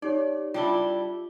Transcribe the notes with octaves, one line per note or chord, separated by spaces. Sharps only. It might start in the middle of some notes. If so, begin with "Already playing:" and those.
D#4 G4 C#5 D5
G3 D4 E4 F4 G7